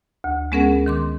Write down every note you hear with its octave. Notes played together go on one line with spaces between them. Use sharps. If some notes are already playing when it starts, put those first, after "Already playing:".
D2
G#3 B3 C#4 G#4 A#4 F#5
D#3 C6 D6